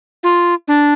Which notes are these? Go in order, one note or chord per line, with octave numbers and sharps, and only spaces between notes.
F4
D4